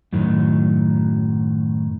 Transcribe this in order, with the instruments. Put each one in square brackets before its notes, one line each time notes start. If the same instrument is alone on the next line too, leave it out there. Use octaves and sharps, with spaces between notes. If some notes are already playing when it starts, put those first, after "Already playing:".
[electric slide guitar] F#2 A2 D#3 F#3